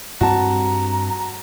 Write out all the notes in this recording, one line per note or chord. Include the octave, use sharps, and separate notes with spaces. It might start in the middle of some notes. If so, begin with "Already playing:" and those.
G2 C4 F#4 A5 A#5